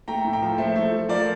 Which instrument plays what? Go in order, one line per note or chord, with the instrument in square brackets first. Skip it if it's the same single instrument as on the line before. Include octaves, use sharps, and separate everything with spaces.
[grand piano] A3 G5 A#5
A2
G5 A#5
F3
A3 C5 E5
A3
A3
F3 A#4 D5